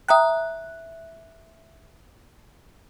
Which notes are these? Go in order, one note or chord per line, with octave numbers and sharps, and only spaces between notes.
E5 G5 A#5 D#6 F#6